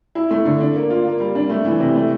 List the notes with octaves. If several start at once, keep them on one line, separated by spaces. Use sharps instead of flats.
E4
A3
D3
D4
A#3
F4
A#3
G3
D4
A3
E3
C3
A3